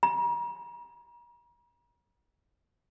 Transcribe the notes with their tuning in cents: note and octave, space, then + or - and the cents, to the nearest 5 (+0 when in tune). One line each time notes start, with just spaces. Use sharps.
A#5 +40